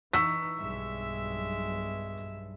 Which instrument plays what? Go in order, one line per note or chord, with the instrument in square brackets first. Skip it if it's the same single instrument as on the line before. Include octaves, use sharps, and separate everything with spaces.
[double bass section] E3 [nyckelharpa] D#4 [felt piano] C#6 E6 B6
[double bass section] B1 G2 [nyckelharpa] G#3 E5